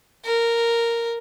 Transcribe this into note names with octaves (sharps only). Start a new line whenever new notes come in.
A#4